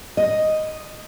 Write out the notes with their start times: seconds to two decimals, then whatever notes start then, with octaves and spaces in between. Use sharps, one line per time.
0.17 D#5